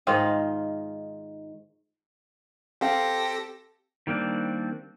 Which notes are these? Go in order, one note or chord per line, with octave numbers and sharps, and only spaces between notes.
G#2 D#3 F4 D#5
C4 G4 A4 F5 A#6
D#3 G3 A#3 C4 D4